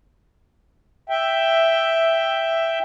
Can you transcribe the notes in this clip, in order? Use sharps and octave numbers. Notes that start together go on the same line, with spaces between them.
E5 G5